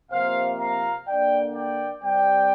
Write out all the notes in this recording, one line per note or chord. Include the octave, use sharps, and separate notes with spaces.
C3 F3 A#3 C5 F5
F5 A#5
D3 A#3 D4 D5 G5
D5 G5
C3 G3 C4 D5 G5